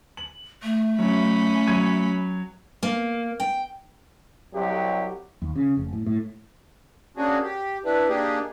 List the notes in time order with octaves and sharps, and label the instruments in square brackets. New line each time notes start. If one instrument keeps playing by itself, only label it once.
[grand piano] F#7
[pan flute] A3
[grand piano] F#3 [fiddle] C#4 B5
[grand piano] F#3 G#6 D#7
[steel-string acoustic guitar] A#3
G5
[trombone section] C2 F#3 G4
[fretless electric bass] D#2
C#3
F1
A2
A2
[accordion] A#3 C#4 D4 F#4 G#4
G4
D4 E4 B4
A#3 D4 D#4 G4 G#4